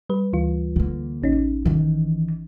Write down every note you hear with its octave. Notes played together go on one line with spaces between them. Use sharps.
G3 B4
D2 E3 F4
D3 A#3
A1 C#4 D#4
D#3 E3